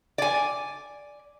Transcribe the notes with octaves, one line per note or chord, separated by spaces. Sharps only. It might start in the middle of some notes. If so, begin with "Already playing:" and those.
D5 G#5